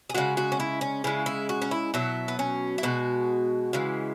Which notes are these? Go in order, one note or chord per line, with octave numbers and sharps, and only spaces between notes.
G#4
C#3 G#3 F#4
F#4
C#4
E4
C#4
C#3 G#3 E4
E4
F#4
C#4
E4
B2 F#3 E4
B3
C#4
E4
B2 G#3 F#4
C#3 E3 G#3